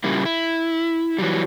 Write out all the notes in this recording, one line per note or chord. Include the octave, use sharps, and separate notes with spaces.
A#2 C#3 G3 A#3 E4
E4
E3 F#3 G3